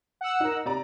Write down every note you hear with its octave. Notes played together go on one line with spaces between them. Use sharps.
F#5 E6
D#4 A#4
C3 D5 A#5